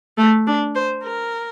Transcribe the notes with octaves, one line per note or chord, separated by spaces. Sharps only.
A3
D4
C5
A#4